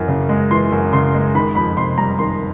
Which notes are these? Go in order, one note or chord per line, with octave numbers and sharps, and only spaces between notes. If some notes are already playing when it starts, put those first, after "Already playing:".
Already playing: F#2 E3
C#3
G#3
E3 C6
F#2
C#3 C6
G#3
D#3 B5
F2 B5
C3 C6
G3 A#5
D#3 C6